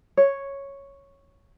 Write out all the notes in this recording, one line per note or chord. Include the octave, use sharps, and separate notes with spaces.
C#5